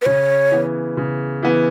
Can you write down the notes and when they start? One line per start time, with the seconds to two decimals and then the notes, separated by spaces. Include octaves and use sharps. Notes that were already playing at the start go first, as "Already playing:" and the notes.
0.02 B4
0.06 C#3 C#5
0.51 E3 B3
0.97 C#3
1.42 E3 B3